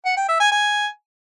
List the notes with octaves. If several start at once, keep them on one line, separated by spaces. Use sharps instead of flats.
F#5
G5
E5
G#5
G#5